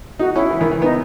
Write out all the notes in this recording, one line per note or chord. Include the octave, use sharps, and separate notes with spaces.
D#4 F#4
C#4 E4
E3
D#3
E3
B3 D#4